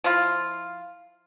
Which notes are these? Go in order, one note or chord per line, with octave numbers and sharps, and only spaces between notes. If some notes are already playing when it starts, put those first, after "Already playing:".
F3 E4 F4